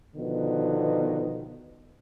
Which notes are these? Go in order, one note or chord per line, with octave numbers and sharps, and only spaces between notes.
B2 D3 D#3 F3 B3